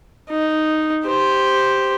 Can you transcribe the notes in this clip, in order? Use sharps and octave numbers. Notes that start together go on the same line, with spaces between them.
D#4
G4 C5